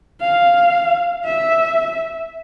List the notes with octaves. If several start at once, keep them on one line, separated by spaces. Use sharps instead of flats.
F5
E5